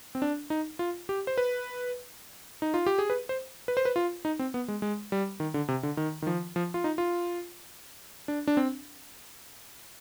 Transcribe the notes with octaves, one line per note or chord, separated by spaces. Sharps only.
C4
D4
D#4
F4
G4
C5
B4
D#4
F4
G4
G#4
B4
C5
B4
C5
B4
F4
D#4
C4
B3
G#3
G#3
G3
D#3
D3
C3
D3
D#3
D#3
F3
F3
F4
D#4
F4
D4
D4
C4